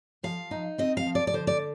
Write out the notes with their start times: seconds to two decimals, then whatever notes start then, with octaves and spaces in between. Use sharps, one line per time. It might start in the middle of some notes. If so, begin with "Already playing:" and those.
0.23 F3 F5
0.51 D#4
0.78 C4 D#5
0.97 F5
1.06 F3
1.15 D5
1.27 D5
1.33 D3 C5
1.47 D5